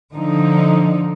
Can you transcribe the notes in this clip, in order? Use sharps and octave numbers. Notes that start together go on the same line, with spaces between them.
D3 F3 D#4